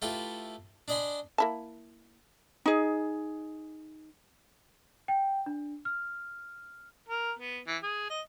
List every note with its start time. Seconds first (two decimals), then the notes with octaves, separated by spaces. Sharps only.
0.02 A3 E4 F4 G4 A4 B4
0.88 D4 D5 D#5 G#5 B5 C6
1.38 A#3 E4 A5
2.66 D#4 G#4
5.08 G5
5.46 D4
5.85 F6
7.08 A#4
7.39 B3
7.67 E3
7.83 G#4
8.10 D#5